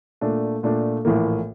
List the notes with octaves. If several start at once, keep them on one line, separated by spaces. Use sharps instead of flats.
A#2 A3 D4
A#2 A3 D4
A#1 A2 E3 A#3